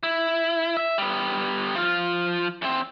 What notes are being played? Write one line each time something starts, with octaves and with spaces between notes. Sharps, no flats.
E4
E5
G3 B3
F3 F4
E2 C4